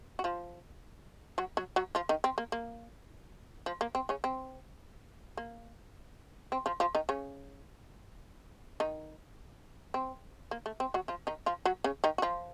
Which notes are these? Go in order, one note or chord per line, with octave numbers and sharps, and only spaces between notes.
F#4
F3 F4
F#3 F#4
F#3 F#4
F#3 F#4
F3 F4
D#3 D#4
C4
A#3
A#3
F3
A#3
C4
C#3 C#4
C4
A#3
C4
F3 F4
F3 F4
D#3 D#4
C#3 C#4
D#3 D#4
C4
A#3
A3
C4
F#3 F#4
F3 F4
D#3 D#4
F3 F4
F#3 F#4
C#3 C#4
D#3 D#4
F#4
F3 F4